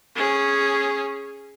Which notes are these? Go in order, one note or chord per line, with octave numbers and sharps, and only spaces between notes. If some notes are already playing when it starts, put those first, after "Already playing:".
C#4 G#4